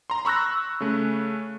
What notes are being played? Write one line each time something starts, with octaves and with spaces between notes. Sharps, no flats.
A#5 C6
B5 C#6 E6 F#6 A#6
C#3 A3